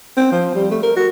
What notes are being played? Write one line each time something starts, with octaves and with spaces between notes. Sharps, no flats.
C4
F3
G3
A3
A#4
F#4